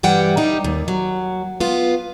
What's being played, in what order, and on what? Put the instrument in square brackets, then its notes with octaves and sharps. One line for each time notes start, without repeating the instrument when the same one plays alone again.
[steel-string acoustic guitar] G2 E3 G3 F#5 G5
G3 D#4
D#2
F#3
B3 F4